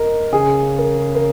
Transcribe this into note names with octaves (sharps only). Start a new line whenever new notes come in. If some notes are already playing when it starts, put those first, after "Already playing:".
Already playing: A#4 D#5
C#3 G#4
A#4
A#4